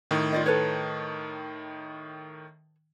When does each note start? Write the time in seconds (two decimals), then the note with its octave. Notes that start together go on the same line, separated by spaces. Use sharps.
0.11 A2 D#3
0.33 F4 D5 D#5
0.46 A4 B4 C#5